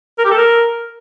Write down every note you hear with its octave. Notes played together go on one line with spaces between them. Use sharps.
A#4
G4
A4
A#4